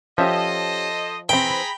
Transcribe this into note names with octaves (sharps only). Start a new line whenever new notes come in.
F3 C#4 G4 A4 C5 D#5 E5
E3 C4 G#4 G5 A#5 B5